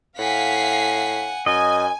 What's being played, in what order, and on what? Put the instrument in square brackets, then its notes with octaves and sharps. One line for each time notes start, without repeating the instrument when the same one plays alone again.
[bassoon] A2 [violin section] F5 B6 C7 [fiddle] F#5 G#5
[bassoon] F#2 [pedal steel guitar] D#5 [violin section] G#5